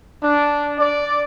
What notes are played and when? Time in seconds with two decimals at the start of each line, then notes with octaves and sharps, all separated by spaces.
0.22 D4
0.79 D5